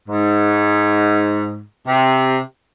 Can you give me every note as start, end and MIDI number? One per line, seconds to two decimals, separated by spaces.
0.09 1.62 44
1.87 2.39 48